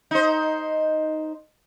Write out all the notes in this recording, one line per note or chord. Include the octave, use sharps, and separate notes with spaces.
D#4 C5